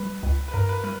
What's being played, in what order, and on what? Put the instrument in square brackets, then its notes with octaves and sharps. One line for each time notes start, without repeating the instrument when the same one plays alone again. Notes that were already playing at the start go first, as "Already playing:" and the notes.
Already playing: [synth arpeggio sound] G3 [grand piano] B4
[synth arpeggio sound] C#2
[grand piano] B4
[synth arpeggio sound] G2 [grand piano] A#4
[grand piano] B4
[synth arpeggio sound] G3 [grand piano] B4